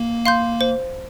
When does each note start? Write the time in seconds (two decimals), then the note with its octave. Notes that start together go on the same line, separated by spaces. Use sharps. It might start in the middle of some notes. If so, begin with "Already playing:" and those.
Already playing: A#3
0.25 F5 C6 G6
0.61 C5